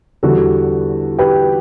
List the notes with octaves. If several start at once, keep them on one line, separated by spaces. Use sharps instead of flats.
E2 D3 G3 F#4 A4
G4 B4